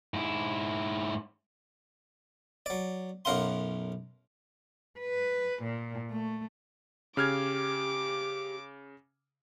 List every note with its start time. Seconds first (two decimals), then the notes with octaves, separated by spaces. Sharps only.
0.14 G#2 E4
2.66 F#3 D5
3.25 B1 F#2 A#4 F5 F#5 C6
5.00 B4
5.63 A#2
6.10 A3
7.17 C#3 G4 D6 F6 G#6